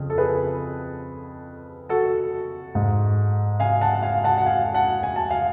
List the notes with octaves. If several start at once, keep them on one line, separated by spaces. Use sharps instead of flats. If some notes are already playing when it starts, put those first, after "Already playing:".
Already playing: F2 C#3
A4
G#4 B4
F#4 A4
G#2
F5 G#5
F#5 A5
F5 G#5
F#5 A5
F#5
F5 G#5
F#5 A5
G#5
A5
F5 G#5